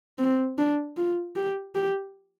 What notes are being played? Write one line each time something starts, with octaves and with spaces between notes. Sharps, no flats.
C4
D4
F4
G4
G4